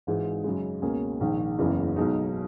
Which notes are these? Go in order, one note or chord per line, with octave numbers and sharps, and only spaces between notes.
G#1 G#2 E3 G#3
F#2 C#3 G#3
C#2 B2 A#3 C#4 G#4
A#1 G#2 D#3
F#1 E2 C#3 E3
B1 B2 G#3 D#4